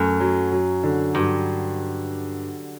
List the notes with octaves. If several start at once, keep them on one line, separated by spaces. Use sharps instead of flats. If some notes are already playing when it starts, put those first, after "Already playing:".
Already playing: F#2 A3
F#3
F#3
D3
G2 F#3